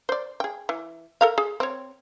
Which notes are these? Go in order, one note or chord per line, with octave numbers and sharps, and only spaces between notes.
C5 D5
G#4 G5
E3
A4 A#4 F5
G#4
C4 C#5